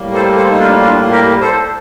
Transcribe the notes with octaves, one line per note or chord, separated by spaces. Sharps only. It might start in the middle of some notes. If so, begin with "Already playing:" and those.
Already playing: A2 G3 A#3
A4 C5
A4 C5
D#4
D4 F4
D4 F4
G4 A#4
A4 C5